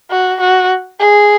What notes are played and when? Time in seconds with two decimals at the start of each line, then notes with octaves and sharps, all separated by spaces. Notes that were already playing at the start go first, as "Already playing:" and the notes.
0.11 F#4
0.40 F#4
1.00 G#4